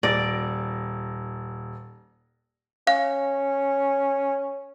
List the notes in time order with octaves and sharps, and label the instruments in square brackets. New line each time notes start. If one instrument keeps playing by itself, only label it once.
[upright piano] D#1 A#6 D7 [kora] D5
[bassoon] C#4 [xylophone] F5